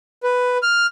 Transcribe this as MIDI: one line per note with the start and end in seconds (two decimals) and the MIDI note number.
0.23 0.58 71
0.63 0.86 89